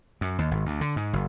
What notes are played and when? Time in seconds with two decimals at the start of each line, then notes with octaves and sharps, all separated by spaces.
0.21 F#2
0.38 D#2
0.51 G#1
0.65 D2
0.81 D3
0.96 G#2
1.13 F#1